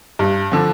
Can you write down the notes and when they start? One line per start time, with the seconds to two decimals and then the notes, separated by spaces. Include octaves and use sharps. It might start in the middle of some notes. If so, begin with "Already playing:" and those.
0.19 G2
0.52 D3 F3 C4